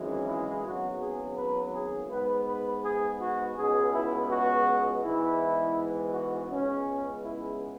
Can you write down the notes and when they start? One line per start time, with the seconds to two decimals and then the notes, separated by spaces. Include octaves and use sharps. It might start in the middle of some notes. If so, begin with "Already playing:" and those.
Already playing: G#1 F#2 C#3 E3 G#3
0.27 E4
0.64 G#1 F#2 C#3 F#3 B3 F#4
1.00 G#4
1.37 B4
1.74 G#4
2.11 G#2 G#3 B3 B4
2.47 B4
2.84 G#4
3.21 F#4
3.57 C#2 B2 G#3 B3 G#4
3.94 E4
4.31 F#4
5.04 G#2 E3 G#3 B3 E4
6.14 F#4
6.50 C#2 C#3 G#3 B3 C#4
7.24 E4